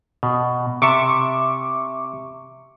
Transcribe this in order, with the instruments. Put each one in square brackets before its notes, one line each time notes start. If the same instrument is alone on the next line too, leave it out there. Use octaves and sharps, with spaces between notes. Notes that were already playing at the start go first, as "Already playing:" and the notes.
[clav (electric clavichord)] B2
[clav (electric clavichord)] C3 A5 [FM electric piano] E5 C#6 D6